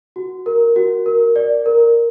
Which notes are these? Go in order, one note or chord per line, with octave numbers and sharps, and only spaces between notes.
F#4
A#4
F#4
A#4
D5
A#4